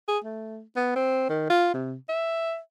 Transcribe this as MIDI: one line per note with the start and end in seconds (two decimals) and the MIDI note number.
0.08 0.18 68
0.24 0.62 57
0.76 0.93 59
0.96 1.29 60
1.29 1.45 51
1.50 1.73 65
1.74 1.95 48
2.09 2.59 76